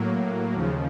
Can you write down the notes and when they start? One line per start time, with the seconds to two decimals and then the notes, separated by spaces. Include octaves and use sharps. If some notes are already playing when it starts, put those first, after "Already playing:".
Already playing: A2 F#3 A#3
0.54 D#2 C#3 F3